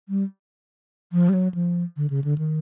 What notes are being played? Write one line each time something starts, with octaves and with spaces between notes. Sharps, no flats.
G3
F3
G3
F#3
F3
D3
C#3
D3
D#3